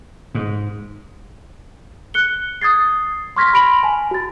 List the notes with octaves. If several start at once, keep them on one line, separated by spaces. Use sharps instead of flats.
G#2
F#6 C#7 G7
D#6 G#6 A6 C7
C6 C#6 F6 G#6 A#6 B6
B5 A#6 D7 F7 F#7
G#5 A5
F#4 A6